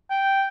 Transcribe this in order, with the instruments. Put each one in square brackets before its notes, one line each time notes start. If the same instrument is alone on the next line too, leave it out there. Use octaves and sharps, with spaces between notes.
[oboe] G5